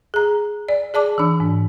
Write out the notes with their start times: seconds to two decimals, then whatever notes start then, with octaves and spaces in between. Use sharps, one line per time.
0.14 G#4 A#5
0.69 D5
0.94 G#4 D5 A5 D6
1.18 E3 D4
1.40 G#2